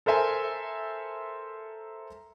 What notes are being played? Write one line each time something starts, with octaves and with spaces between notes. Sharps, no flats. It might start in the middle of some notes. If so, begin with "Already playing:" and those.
A4 A#4 C5 E5 G#5